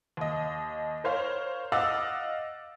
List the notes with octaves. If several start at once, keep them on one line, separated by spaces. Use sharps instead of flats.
D#2 D#5
A#4 C5 C#5 F5
D#5 F5 F#5 D6 E6 A6